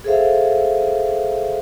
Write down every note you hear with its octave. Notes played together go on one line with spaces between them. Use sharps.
G#4 A4 C5 E5 F5